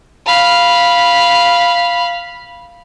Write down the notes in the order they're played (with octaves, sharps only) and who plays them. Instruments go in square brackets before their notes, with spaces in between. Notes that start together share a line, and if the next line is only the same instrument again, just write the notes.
[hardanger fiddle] F5 B5